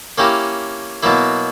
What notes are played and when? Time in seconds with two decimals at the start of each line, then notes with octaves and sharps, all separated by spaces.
0.18 A#3 C#4 E4 G4 A#4
1.03 B2 F#3 A#3 E4